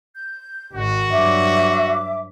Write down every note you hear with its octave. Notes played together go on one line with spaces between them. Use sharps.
G6
G#1 D#3 F#4
G2 F#3 E5 D6